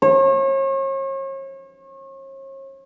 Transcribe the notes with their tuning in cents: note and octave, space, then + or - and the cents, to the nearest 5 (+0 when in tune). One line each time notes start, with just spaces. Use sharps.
C#5 -40